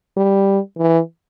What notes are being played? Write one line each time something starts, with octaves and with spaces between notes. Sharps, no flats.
G3
E3